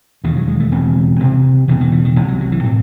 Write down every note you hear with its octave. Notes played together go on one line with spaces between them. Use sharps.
E1 D#2 C#3 E3
F#3
G#3
A3
E1 E2 C#3 C4
C2 C3 C4
E1 E2 C#3 E3
D#3
E3
D#3
C2 C3 E3
F#3
F#3
E3
A2 C4